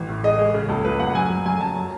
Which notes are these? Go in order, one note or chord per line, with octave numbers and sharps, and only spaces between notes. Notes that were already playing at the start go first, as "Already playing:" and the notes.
Already playing: A1
A2
G#3 D#5
G#3
C#3
C#2 A4
C#2 B4
C#2 F#5
F#2 G#5
F#2
F#2 G#5
F#2 A5
F#3